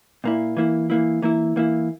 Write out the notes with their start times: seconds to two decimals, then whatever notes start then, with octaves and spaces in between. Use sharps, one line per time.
0.24 A#2 A#3 E4
0.57 E3 A#3 E4
0.90 E3 A#3 E4
1.22 E3 A#3 E4
1.56 E3 A#3 E4